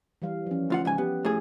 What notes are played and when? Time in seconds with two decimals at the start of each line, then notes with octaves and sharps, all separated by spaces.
0.22 E3 G3 F5
0.47 F3 C#4
0.70 D2 F4 F#5
0.85 G#2 C#3 G#5
0.98 B3 G4
1.25 A2 G#4